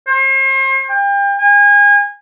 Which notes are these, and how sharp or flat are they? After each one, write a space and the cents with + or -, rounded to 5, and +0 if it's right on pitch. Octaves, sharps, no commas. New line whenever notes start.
C5 +40
G5 +35
G#5 -30